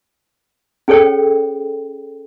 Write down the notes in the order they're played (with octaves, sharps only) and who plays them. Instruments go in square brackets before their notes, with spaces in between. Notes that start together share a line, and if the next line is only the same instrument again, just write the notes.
[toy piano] C#4 G#4 A4 C5 C#5 G5